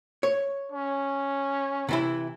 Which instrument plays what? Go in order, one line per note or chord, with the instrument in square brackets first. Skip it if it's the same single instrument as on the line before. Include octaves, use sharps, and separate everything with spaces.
[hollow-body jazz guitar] C#5
[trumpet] C#4
[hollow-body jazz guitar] C3 E3 E4